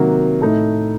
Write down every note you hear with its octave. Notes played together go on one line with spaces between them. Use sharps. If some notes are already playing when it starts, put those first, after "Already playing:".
Already playing: C3 D#3 F#3 A#3 F#4
A2 A3 D#4